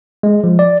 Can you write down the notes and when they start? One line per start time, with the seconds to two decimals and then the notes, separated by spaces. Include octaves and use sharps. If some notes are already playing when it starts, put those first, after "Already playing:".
0.23 G#3
0.44 F3
0.59 D5